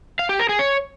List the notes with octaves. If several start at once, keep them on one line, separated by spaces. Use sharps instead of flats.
F5
G4
A#4
G#4
C#5